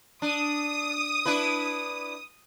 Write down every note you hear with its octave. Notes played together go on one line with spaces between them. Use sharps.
D4 D#6
D4 E4 B4